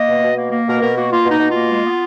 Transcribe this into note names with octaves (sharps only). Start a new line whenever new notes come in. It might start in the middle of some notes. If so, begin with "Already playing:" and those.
Already playing: A#3 D#5
B2
B2
A#3
A#3
B2 A#4
B2 A#4
A#3 F#4
A#3 F4
B2
D#4
B2
A#3 F4
G#3
B3